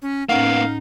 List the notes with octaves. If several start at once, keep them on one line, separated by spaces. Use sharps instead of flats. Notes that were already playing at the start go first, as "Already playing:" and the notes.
C#4
A2 A#3 B3 C#4 D#4 F5 F#5